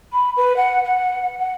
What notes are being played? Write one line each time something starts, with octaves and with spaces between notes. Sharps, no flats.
B5
B4
F#5
F#5
F#5